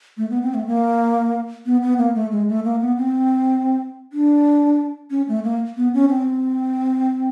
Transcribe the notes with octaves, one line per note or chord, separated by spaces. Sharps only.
A3
B3
C4
A3
A#3
B3
B3
A#3
A3
G#3
A3
A#3
B3
C4
D4
C#4
A3
A#3
B3
C#4
C4